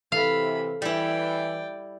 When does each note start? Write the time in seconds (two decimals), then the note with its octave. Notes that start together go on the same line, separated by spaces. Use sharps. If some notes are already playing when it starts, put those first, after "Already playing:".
0.12 C3 E3 A4 F5 B5
0.82 E3 G3 E4 D5 G5